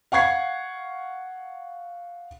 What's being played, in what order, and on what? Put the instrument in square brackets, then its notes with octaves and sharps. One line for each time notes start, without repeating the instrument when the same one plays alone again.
[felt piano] F5 F#5 C#6 G#6 C7